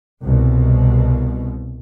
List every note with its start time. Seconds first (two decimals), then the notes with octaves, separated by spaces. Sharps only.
0.24 C2 B2